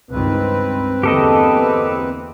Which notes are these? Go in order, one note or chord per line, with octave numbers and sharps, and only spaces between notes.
C#2 G2 D#3 C4 B4
E2 D3 A#3 G4 A4 D#5